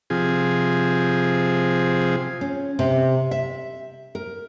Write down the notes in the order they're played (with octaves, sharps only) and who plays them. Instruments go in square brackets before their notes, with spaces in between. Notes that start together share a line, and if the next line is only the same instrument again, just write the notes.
[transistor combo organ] C3 F3 G#4
[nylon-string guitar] C#4
C3
E5
A#4